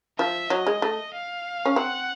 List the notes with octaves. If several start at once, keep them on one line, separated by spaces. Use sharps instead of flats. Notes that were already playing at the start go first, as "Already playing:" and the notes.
F3 E5
F#3 D#5
G#3
A3
F5
C#4
C4 F#5